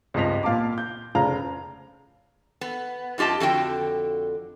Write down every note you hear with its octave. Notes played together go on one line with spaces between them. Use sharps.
C#2 G2 C4 D#5 B6 F7
A#2 F5 A5 D6
G6
F1 C#3 C5 F5 A#5 F7
B3
F#2 F4 G4 D#5 A5
F2 D3 F#4 G5